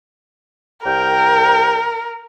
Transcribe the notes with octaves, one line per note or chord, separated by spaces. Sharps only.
C2 A#4 G5